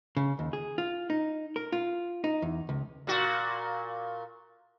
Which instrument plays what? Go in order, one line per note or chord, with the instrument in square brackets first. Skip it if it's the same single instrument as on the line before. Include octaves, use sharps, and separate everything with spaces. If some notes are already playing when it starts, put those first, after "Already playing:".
[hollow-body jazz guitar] C#3
D#2
G#4
F4
D#4
A#4
F4
D#4
E2
C#2
[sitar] A#2 F#4